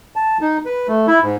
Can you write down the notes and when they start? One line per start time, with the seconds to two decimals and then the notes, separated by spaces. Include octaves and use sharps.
0.16 A5
0.41 D#4
0.65 B4
0.88 A3
1.07 E4
1.22 G#2